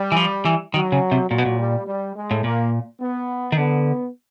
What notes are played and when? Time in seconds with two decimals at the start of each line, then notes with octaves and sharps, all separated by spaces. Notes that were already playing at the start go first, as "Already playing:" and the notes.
Already playing: G3
0.12 E3
0.16 F3
0.45 E3
0.74 D#3 F#3
0.92 C#3
1.12 C3
1.30 A#2 F#3
1.38 B2
1.46 A#2
1.58 G3
1.87 G3
2.16 G#3
2.31 A2
2.44 A#2 A#3
3.00 B3
3.52 D#3
3.57 D3 B3